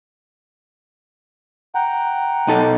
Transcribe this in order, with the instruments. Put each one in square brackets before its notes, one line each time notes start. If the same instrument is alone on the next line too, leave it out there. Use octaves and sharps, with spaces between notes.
[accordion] F#5 G5 A#5
[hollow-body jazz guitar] B1 D#4 A4